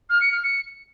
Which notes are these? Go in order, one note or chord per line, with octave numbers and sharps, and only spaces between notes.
F6
C#7
F6
C#7